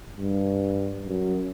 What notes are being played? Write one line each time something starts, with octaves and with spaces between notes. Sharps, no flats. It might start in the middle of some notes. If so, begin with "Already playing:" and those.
G2
F#2